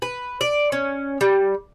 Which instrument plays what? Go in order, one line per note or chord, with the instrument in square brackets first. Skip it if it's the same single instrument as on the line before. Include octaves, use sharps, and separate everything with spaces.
[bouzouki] B4
D5
C#4
G3